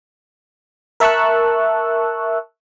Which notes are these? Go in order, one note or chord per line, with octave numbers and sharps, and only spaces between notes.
A#4 E5 A5 C#6 E6 F#6